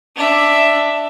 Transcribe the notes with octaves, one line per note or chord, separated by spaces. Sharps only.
D4 E5